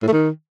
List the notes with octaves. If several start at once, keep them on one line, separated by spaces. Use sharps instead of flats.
A2
A3
D#3